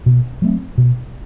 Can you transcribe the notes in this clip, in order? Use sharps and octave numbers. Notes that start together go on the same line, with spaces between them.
B2
F#3 A3 C4
B2